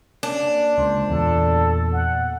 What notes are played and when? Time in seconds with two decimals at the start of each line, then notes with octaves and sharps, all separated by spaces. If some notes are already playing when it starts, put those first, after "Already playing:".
0.23 A#3 C#4 D4
0.78 C#2 C5
1.09 E2 A#2 A4
1.92 F#5